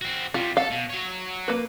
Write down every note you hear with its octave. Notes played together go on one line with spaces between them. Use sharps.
C4 F#4
C3 G3 F4
A4 F5
B2
F#3 C#5
A#3 B4